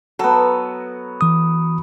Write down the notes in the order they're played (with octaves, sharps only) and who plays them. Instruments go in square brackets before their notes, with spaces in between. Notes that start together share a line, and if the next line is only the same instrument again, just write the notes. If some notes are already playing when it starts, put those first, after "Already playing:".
[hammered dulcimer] F#3 B3 [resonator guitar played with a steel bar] A4
[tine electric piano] E3 D#6